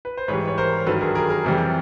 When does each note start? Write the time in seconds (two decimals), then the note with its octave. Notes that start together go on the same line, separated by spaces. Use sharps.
0.05 B4
0.17 C5
0.28 G#2 E3 G3 B4 C#5
0.47 C#5
0.58 A#4 C5
0.86 G2 D#3 F#3 A4 B4
1.01 G#4 A#4
1.15 G#4 A#4
1.30 G#4 A#4
1.44 F2 C3 E3 G3